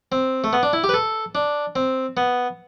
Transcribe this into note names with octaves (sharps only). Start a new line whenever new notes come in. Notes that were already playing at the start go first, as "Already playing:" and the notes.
C4
A3
B3
D4
E4
G4
B4
A4
D4
C4
B3